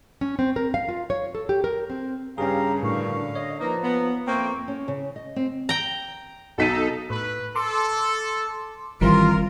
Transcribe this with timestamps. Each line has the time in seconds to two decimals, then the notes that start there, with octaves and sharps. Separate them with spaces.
0.21 C#4
0.39 C4
0.56 A#4
0.74 F5
0.89 F4
1.10 C#5
1.35 A4
1.49 G4
1.64 A#4
1.90 C4
2.38 G2 C#3 C#4 G4 G#4 F5 A#5
2.83 F#2 A2 D3 D4 F5 C#6
3.35 C#5 D#5
3.60 F3 A#3 D#4 B4 A#5
3.83 B3
4.27 F2 A3 A#3 C4 G5 C#6
4.68 C#4
4.88 C#3
5.16 D#5
5.36 C4
5.69 G5 A#5
6.58 B1 D#4 A4 B6 D#7
7.10 A2 B4
7.56 A4 C6 D6
9.01 G1 D#3 E3 G3 C4 F4 A#4 C6